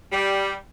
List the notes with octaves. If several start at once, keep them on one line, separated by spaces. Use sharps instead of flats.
G3